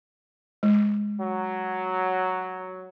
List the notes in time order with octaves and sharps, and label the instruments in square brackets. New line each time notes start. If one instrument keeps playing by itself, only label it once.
[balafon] G#3
[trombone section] F#3